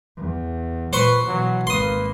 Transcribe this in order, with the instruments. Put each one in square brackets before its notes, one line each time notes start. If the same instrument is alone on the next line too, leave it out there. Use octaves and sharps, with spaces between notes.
[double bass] E2
[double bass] A#2 [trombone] B4 [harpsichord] C5 C6 C#6
[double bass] B2 E3 [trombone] F#3
[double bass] G#1 A#3 [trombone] B4 [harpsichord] C6 D#6